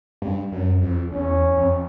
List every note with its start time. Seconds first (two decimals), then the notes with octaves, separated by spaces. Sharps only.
0.22 G2
0.52 F#2
0.82 F2
1.12 E2 C#4
1.57 F2